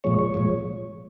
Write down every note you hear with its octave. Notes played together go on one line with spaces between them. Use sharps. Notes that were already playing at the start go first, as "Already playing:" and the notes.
A#2 F3 G#3 C#5
C#5
A#2 F3 G#3